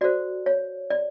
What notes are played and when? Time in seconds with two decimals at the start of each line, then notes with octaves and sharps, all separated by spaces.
0.01 F#4 A4 C5 D5
0.46 C#5
0.90 D5